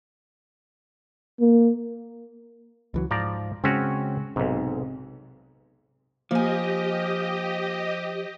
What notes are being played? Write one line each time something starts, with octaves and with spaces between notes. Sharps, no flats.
A#3
C#2 E3 F#3
G#2 F3 D5 A#5
C#3 G#3 C4 C#4 F#4
B1 G#2 C3
F3 A#3 G4 D#5 G#5